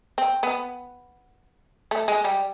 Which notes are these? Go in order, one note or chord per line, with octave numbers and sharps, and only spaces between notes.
C4
B3
A3
G#3
G3